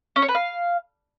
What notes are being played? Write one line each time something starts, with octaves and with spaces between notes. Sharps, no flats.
C#4
C#5
B4
F5